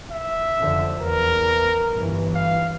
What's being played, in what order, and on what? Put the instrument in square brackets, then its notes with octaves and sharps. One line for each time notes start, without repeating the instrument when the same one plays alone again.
[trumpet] E5
[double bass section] F1 D3 F3
[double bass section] E2 [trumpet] A#4
[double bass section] G1 E3
[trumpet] F5